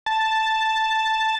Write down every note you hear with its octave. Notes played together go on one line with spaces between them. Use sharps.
A5